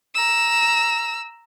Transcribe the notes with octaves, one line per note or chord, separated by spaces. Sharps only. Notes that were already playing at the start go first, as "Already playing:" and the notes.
A#5 E6